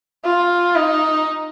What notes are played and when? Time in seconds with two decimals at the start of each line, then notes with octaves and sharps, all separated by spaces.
0.25 F4
0.75 D#4